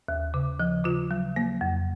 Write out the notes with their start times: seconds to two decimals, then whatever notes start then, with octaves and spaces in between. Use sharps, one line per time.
0.08 D#2
0.34 C#3
0.60 F3
0.85 C#3 F4
1.11 F#3
1.36 A#3
1.61 F2